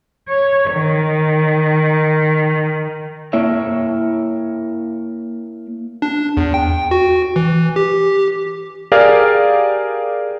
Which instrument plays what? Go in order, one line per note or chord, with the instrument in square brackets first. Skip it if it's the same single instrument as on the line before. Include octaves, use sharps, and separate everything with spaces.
[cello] C#5
D#3
[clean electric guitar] A#3 E4 C#5 E5
[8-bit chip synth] D4
E2
G5
F#4
E3
G4
[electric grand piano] G4 G#4 A#4 D5 F5